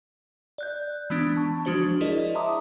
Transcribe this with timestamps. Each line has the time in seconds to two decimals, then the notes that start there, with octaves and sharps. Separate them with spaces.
0.58 D5 F#6 G6
1.10 E3 G#3 B3 D4
1.37 A5 C#6
1.65 F3 G#3 D4 F#4 C5 G7
2.01 E4 G#4 A#4 C5 D5 D#5
2.35 E5 A5 A#5 C6 D6 D#6